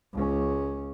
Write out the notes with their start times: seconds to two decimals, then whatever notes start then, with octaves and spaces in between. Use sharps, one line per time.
0.13 C#2 C#4